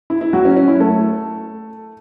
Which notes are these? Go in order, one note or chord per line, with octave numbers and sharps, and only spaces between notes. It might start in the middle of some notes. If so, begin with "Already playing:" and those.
E4
E4
F#3 F#4
C#4
C#4
E4
A3 A4